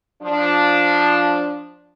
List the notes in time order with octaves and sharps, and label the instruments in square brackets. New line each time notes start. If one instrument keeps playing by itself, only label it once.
[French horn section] F3 D4